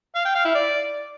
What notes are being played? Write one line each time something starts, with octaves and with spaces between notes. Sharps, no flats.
F5
G5
F5
E4
D5